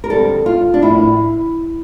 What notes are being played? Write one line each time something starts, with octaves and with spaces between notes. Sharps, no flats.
A#4
F2 D3 G3 A4
F4
D4
A2 F3 A#3 E4